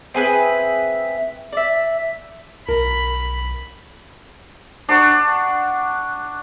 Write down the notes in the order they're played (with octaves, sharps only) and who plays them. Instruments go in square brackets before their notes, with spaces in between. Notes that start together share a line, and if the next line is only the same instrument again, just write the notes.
[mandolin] C4 G#4 B4 E5
D5 E5
[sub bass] B1 [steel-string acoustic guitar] A#4 [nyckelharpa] B5
[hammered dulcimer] D4 F#5 C#6